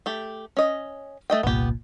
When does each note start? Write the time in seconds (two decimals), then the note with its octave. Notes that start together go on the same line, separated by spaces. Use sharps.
0.06 A3 G4
0.57 C#4 D#5
1.30 A3 D#5 G5
1.43 G1 C2 A#2 B3 G4